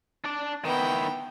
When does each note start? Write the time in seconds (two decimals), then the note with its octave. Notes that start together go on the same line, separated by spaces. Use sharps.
0.24 D4 D5
0.65 D#3 B3 E4 G5